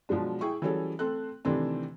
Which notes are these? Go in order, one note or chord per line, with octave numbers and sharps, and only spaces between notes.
B2 F3 F#3 G#3 D4
E4 G#4 G5 C#6
E3 F#3 G3 C#4 G#4 A4
A3 C4 A4 F#6
C3 D#3 E3 A3 C4 D4